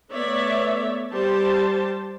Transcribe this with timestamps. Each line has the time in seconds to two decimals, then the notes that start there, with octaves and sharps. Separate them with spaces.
0.12 A3 B3 C#5 D5 E5
1.13 G3 G4 C5 A5